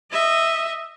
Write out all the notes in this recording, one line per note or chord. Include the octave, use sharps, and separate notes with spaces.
D#5 E5